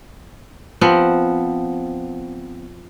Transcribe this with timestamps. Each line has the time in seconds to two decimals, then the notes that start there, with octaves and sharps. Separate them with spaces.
0.81 F3 B3 C4